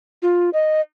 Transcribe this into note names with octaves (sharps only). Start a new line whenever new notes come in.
F4
D#5